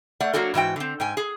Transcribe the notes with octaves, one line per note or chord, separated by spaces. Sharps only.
A3 D5 F#5
F#3 A#3 D4 F#4 G4 A4
G#2 E3 F#4 G5
D3 C4
G#2 G5 G#5
G#4